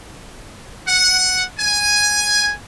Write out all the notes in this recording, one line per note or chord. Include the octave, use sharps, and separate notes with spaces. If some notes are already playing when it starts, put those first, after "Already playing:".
F#5
G#5